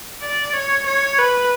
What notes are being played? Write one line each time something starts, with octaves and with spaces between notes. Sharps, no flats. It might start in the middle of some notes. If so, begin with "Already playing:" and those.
D5
C#5
C#5
B4